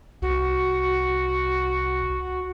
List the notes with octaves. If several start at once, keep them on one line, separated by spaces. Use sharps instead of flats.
C2 F#4